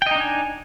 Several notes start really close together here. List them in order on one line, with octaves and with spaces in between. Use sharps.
G5 D#5 D#4 D4 G#5